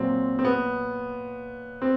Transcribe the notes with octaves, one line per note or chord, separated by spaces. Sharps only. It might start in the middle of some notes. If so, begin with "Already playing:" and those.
Already playing: A#2 F#3 C4
C4
B3
C4